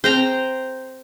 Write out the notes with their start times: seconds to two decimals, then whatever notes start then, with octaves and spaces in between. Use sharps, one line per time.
0.04 C4 G#4 C5 G5 A#5